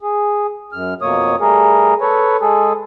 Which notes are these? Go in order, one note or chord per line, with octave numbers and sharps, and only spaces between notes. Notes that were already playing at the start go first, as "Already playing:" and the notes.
G#4
F#2 F6
F2 B2 A#3 C#5 D#6
G3 A3 G#4 A#4
A4 B4 C#5
G#3 G#4 A4